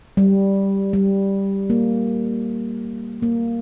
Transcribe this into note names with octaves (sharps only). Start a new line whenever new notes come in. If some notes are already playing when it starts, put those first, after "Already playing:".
G3
G3
A#3
A#3